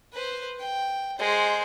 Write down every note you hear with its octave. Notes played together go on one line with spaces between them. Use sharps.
B4 C5
G5
G#3 C5